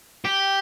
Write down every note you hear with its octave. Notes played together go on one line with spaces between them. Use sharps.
G4